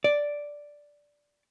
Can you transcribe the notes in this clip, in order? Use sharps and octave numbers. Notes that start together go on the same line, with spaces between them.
D5